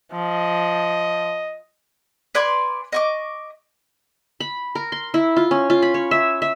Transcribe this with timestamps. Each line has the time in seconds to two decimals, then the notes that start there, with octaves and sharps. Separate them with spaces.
0.12 F3 D#5
2.35 B4 D5 G#5 C6
2.93 D#5 C#6 D6
4.40 B5
4.75 A#4
4.92 C6
5.14 E4
5.36 F4
5.51 C#4
5.70 F4
5.82 B5
5.94 C#5
6.11 E5
6.42 E5